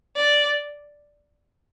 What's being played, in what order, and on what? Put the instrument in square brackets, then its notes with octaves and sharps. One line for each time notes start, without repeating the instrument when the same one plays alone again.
[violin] D5